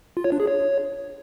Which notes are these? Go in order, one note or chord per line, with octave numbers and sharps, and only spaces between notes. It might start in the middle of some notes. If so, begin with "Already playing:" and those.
F4
C#5
D4
G#4
C#5